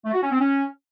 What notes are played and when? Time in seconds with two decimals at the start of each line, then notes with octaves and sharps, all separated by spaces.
0.04 A3
0.13 F#4
0.22 C#4
0.31 C4
0.40 C#4